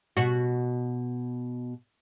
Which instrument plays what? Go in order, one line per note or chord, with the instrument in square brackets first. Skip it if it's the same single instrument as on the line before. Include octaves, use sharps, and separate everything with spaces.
[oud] B2 F#4